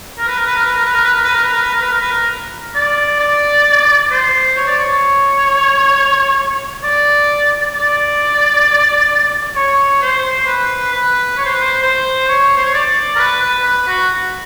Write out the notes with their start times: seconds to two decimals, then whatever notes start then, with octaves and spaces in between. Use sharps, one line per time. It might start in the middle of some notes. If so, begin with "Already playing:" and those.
0.18 A#4
0.28 B4
0.37 A#4
0.46 B4
0.56 A#4
0.66 B4
0.76 A#4
0.85 B4
0.94 A#4
1.05 B4
1.15 A#4
1.24 B4
1.34 A#4
1.44 B4
1.53 A#4
1.63 B4
1.72 A#4
1.82 B4
1.91 A#4
2.01 B4
2.11 A#4
2.76 D5
3.20 D5
4.11 C5
4.57 C#5
4.68 D5
4.79 C#5
6.84 D5
7.75 D5
9.56 C#5
10.02 C5
10.40 C5
10.47 B4
10.93 B4
11.38 C#5
11.45 C5
11.54 B4
11.61 C5
11.83 C5
12.28 C#5
12.57 C5
12.65 C#5
12.74 D5
13.15 A#4
13.19 B4
13.42 B4
13.65 B4
13.88 F#4